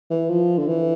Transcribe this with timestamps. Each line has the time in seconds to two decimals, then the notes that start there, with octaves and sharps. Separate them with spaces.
0.10 E3
0.29 F3
0.58 D3
0.68 E3